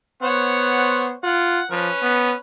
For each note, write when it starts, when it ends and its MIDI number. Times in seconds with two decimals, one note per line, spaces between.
0.22 1.14 59
0.22 1.16 72
0.22 1.16 73
0.22 1.16 78
1.23 1.61 65
1.23 1.68 78
1.71 1.90 53
1.71 2.36 61
1.71 2.36 71
2.02 2.34 59